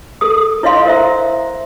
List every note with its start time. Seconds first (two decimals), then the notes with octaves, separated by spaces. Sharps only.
0.21 A4 A#4 D#6
0.63 E4 C#5 D#5 F5 C6
0.85 A#4 C5 E5 A#5